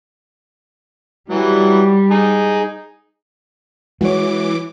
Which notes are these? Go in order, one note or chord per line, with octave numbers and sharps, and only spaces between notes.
E3 F#3 G3
D#4 G#4
E3 G#3 F#4 C#5 D6